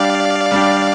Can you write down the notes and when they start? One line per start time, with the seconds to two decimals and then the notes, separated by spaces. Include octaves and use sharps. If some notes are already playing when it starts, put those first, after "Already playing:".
Already playing: G3 D4 G4 D5 F5
0.52 G3 D4 G4